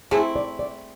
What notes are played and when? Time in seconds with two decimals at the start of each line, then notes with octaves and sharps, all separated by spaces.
0.11 A3 C4 E4 G#4
0.36 D5
0.59 D5